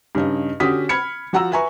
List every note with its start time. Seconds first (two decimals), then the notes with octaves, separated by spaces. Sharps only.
0.15 G2 C#3 D#4 D#5
0.60 D3 C#4 F#4 G4 D#6 B6
0.89 B5 F6 G#6 C#7
1.33 F3 F#4 F#5 A#5 E6
1.52 B4 E5 G#5 A#5 C#6